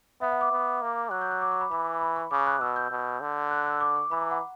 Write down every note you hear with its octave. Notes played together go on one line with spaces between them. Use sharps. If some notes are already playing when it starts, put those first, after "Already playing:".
B3 E5
F#5
D6
B3
A#3
F#3 F#6
G6
F#6
D6
C#6
B5
E3 B5
B5
C#6
C#3 D6
F#6
B2 E6
G6
B2
D3
F#6
E6
D6
C#6
E3 B5
A#5
F#5